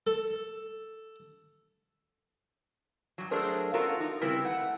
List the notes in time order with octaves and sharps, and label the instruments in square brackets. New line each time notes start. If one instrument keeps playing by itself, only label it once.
[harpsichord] A4
[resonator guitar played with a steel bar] G2 F#3
F#3 A3 D4 G#4 A#4 C5
B3 C#4 F4 F#4 A4 A#4
D#4
C#3 G3 C4 E4 A#4 B4
A3 F#5